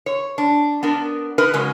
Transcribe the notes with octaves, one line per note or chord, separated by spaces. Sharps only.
C#5
D4
B3 D4 A#4
D#4 A#4 B4
C#3 F#3 G#3 C#4